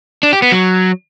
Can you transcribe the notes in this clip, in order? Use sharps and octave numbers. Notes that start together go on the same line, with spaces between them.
D4
G4
B3
F#3